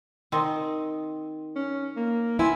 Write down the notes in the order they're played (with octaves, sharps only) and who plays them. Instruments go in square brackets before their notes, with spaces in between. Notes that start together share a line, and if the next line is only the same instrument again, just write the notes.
[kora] D#3 C4 D#5
[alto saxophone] C#4
A#3
[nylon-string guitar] B3 E4 [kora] C4 [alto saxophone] G#5